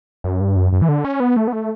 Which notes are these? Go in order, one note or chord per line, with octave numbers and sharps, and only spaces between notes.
F#2
G2
F#2
F#2
E3
D3
C#4
B3
A3
B3
A3